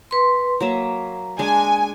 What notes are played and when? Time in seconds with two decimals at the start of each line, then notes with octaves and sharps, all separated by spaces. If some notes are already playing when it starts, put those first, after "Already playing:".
0.11 B4 C6
0.61 F#3 A#3 E5 A#5
1.39 G#3 D4 G#5